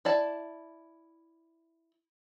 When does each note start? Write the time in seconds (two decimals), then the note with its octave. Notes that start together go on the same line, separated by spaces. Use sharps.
0.05 E4 D5 A5